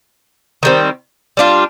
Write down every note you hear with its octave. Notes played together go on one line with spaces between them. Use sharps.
D#3 G3 C4
G3 D4 F4